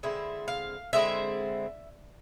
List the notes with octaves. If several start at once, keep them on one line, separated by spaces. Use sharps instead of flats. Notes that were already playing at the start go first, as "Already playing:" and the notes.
D3 G#3 C4 E4 E5
F5
D3 G#3 C4 E4 E5